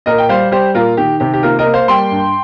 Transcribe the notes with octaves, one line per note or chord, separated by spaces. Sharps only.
A#2 A#4 D#5
G5
G3 C5 F5
G3 G4 C5
A#2 F4 A#4
D#3 G4
C3 G4
G4
A#3 F4 A#4
A#4 D#5
A#3
C5 F5
G3 G5 C6
G2